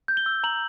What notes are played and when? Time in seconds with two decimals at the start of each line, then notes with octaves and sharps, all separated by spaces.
0.08 G6
0.17 G7
0.26 E6
0.44 A#5 F#7